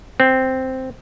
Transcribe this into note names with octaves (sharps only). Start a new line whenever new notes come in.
C4